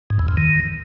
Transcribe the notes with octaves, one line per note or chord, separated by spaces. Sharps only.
G#2
E2
F2
D#3